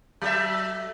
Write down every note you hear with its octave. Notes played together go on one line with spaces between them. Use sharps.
F#3 A4 E5